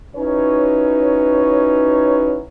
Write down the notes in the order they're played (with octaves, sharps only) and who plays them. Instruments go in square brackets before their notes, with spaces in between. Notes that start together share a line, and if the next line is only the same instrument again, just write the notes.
[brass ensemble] C#4 D#4 E4 F#4 B4 C#5